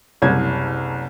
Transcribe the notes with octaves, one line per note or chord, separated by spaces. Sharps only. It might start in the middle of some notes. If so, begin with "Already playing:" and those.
F#1 C2 G#6